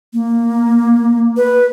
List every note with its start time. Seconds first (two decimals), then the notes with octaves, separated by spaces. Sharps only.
0.13 A#3
1.37 B4